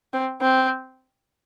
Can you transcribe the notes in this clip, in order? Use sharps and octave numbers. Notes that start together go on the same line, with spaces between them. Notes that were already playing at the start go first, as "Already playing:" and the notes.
C4
C4